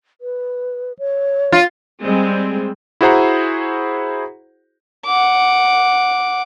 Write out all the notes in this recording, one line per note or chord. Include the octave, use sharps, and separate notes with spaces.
B4
C#5
F4
G3 G#3 C4
E4 F#4 G#4 C5 F#5 A#5
F#5 D6